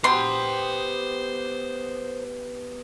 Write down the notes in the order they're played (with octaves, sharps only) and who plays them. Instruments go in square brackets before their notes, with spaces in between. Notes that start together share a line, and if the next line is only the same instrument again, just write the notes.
[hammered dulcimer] B3 G4 [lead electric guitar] C5 A#5 [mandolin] C6